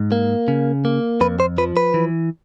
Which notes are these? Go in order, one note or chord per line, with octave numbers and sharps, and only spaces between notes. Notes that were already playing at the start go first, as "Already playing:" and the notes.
Already playing: G#2
A#3
C#3
A#3
F2 B4
C5
F3 B4
B4
E3